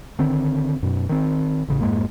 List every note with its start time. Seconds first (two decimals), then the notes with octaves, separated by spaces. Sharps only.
0.19 D3 D#3 C4
0.83 F#2 B2
1.09 D#3 C4
1.68 A1 C#3
1.81 F2 G#2 G#3 A#3